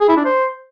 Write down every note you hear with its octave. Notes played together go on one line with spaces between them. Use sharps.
G#4
E4
D4
C5